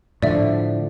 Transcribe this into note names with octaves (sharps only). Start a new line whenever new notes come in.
A2 D3 F3 D5 E5